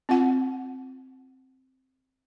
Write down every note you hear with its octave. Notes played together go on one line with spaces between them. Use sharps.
C4 F4 F#5